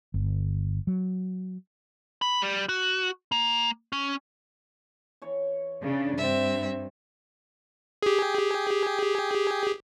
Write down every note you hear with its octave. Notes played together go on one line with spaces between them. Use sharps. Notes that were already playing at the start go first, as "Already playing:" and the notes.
G1
F#3
B5
G3
F#4
A#3
C#4
E3 C#5
C#3 D4
G2 C4 E5
G4 G#4